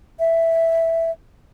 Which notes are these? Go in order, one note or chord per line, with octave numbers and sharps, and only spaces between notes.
E5